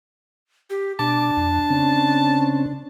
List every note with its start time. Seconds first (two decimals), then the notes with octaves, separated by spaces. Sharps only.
0.70 G4
0.99 B2 D4 A5 D6
1.37 F2
1.70 C#3 C4 C#4